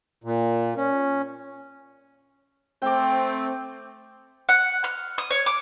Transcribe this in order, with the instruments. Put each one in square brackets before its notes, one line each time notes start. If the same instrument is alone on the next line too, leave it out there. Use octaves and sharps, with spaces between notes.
[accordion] A#2
C#4
[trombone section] A3 C4 [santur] G5 D6
[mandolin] F#5
F6
D#6
C#5
D6